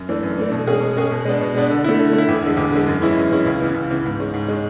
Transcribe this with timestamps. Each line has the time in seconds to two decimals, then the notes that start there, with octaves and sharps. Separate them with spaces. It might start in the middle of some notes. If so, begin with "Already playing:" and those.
Already playing: F#2
0.09 E3 A3 D4
0.23 F#2
0.38 E3 A3 D4
0.52 B2
0.67 G#3 C#4 G#4
0.81 B2
0.96 G#3 C#4 G#4
1.11 B2
1.25 G#3 B3 D4
1.41 B2
1.54 G#3 B3 D4
1.70 D3
1.84 A3 E4
1.99 D3
2.13 A3
2.18 E4
2.29 E2
2.43 D3 G#3
2.57 E2
2.72 D3 G#3
2.87 F#2
3.02 E3 G#3 C#4 E4
3.17 F#2
3.32 E3 G#3 C#4 E4
3.46 C#2
3.61 C#3 E3 B3
3.75 C#2
3.90 C#3 E3 B3
4.05 G#2
4.20 G#3 C#4
4.34 G#2
4.48 G#3 C#4